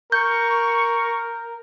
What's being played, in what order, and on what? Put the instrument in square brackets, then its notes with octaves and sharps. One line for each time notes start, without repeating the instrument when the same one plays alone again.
[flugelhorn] A#4 [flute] C#6 [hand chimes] G6